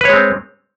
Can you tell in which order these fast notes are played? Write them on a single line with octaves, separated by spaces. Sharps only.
B4 C#5 G#3 C4